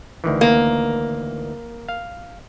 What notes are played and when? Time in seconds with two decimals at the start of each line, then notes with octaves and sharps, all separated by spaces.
0.24 D2 D#3 E3
0.41 A#3
1.89 F5